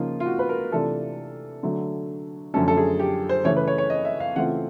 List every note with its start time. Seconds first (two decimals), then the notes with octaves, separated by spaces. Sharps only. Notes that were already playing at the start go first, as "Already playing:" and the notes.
Already playing: C#3 F3 A#3 D#4 F4
0.20 F4
0.26 F#4
0.39 B4
0.49 A#4
0.72 C3 E3 A3 D4 F4 A4
1.63 D3 F#3 A3
2.54 F#2 D3 F3 A3 C#4 A4
2.68 A4
2.77 G#4
2.99 G4
3.29 C5
3.44 C#3 E3 A3 C#5
3.57 B4
3.67 C#5
3.78 C#5
3.90 D#5
4.05 E5
4.20 F5
4.36 C#3 E3 A3 C4 F4 F#5